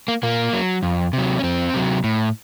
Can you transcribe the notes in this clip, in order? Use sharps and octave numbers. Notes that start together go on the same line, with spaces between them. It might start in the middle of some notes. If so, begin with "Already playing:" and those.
A#3
A#2 A#3
F#3
F2
C3 F#3
C#4
F2 C4
C3 F#3
A2